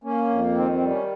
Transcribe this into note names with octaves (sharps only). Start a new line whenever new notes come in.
A#3 C#4
F2
D#3 C4
C4
G3
C#4